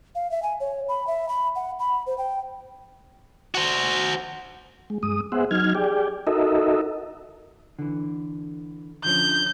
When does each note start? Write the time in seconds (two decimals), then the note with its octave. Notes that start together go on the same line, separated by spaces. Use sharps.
0.15 F5
0.31 E5
0.43 G#5
0.60 C#5
0.89 B5
1.07 E5
1.29 B5
1.56 F#5
1.79 B5
2.07 C5
2.18 G5
3.55 F#4 C5
4.90 G#3
5.03 G2 G#3 D#6
5.32 B3 G#4 C5 E5 F#5
5.51 F#3 D#4 F6 G#6
5.75 G4 G#4 D5 G5
6.27 D#4 F#4 A4 A#4 D#5 E5
7.79 D3 E3
9.04 D3 F3 C#4 G6